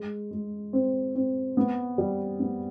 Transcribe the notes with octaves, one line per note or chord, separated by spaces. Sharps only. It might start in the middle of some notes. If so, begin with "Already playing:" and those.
Already playing: G#3
G#3
C4
C4
B3
G3
B3